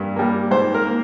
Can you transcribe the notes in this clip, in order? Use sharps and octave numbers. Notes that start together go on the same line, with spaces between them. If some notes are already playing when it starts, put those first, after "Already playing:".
Already playing: G2 G3 A#3
G3 A#3
G#2 C5
A#4
A#3